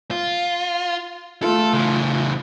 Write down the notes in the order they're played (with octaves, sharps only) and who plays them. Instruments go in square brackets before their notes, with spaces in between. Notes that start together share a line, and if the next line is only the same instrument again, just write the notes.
[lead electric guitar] F4
[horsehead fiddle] A3 F4 [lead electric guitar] A4
[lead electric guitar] C#3 E3